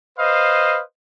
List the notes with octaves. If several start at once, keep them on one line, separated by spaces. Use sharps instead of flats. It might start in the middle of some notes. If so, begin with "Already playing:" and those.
B4 C5 D#5 F5